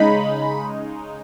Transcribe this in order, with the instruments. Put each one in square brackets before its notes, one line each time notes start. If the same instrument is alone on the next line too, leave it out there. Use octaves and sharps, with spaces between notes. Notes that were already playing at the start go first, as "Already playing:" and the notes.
Already playing: [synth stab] C#3 G#3 D#4 B5